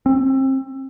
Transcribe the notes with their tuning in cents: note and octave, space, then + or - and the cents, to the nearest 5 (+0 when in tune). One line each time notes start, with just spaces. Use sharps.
C4 +30